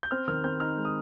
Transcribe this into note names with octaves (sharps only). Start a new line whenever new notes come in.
G6
C4 F6
D#3 F6
C4 G6
D#4 F6
G#3
D#6